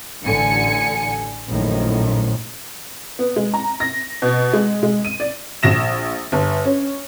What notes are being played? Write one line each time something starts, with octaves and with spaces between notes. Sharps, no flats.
A1 D3 G#5 C#7
A#1 F#2 A2 D#3
B3
G#3
A#5
A#6
B2
G#3
G#3
D#7
D5
A#1 A#6 E7
G1
C#4